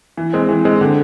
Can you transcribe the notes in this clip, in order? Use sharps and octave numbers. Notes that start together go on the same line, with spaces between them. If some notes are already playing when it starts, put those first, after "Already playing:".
E3
G#3 C4
E3
G#3 C4
D3